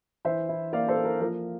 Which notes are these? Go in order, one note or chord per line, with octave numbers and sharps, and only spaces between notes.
E3 C5 E5
E4
A#3 D5 F5
A4 C5
A#3
A#4
F3 A#4